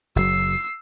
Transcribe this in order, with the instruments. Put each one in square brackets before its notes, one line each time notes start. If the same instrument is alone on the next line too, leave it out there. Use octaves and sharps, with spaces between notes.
[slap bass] F#1 F#3 [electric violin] E6 C7